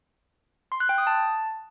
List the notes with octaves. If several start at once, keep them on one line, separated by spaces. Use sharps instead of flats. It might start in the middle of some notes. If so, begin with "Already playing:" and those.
C6
F#6
G5
D#6
A5